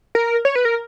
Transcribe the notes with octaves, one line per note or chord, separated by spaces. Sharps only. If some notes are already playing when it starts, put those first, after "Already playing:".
A#4
C#5
B4
A#4